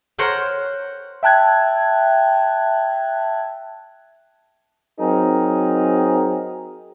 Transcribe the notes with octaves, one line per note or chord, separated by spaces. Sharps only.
A#4 C5 C#5 F#5 G5
E5 G5 A5 F#6 G#6
F#3 C4 D#4 G#4 A#4